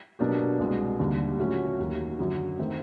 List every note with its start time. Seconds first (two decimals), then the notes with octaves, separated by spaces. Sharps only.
0.19 B2 F#3 A#3 D4 G4
0.59 C2 B2 G#3
0.99 D#2 D3 G3
1.39 A#2 F#3 A3 C#4 F#4
1.79 D#2 D#3 F#3
2.19 F#2 D3 F#3
2.59 D#3 F#3 A3 C4